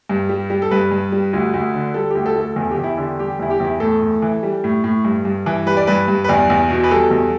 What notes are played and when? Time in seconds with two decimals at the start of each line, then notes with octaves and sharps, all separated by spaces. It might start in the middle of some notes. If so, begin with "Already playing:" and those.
0.09 G2
0.29 G3
0.50 G3
0.62 A4
0.71 G2 B4
0.91 G2
1.12 G3
1.33 D2
1.54 D2
1.74 D3
1.94 G3 A4
2.10 D2 G4
2.26 A4
2.36 D2
2.41 A4
2.56 E2 A4
2.71 G4
2.77 E2
2.84 E4
2.97 D3 G4
3.19 G3 G4
3.39 E2 E4
3.50 G4
3.60 E2 E4
3.80 A2 A4
4.02 A2
4.22 E3
4.43 G3
4.64 A2
4.84 A2
5.04 G2
5.25 G2
5.46 E3
5.66 G3 B4
5.77 D5
5.87 G2 B4
6.08 G2
6.24 B4
6.28 E2 D5
6.50 E2
6.70 B2
6.84 B4
6.91 G3 A4
7.11 E2